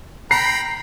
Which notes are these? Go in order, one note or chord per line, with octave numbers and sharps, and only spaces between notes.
G5 A#5 B5 C7